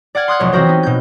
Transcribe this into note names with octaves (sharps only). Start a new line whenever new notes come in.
D5 F#5 F6 G#6
C6 D#6 F#6 G#6
F1 B1 C#5
E3 C4 F#4 A#4 C5
B3 D#4
B2 G6